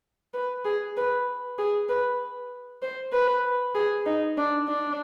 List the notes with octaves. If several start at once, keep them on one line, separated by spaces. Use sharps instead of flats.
B4
G#4
B4
G#4
B4
C5
B4
G#4
D#4
D4
D4